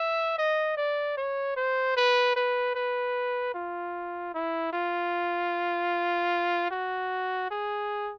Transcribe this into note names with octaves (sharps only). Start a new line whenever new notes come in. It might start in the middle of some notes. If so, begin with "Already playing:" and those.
Already playing: E5
D#5
D5
C#5
C5
B4
B4
B4
F4
E4
F4
F#4
G#4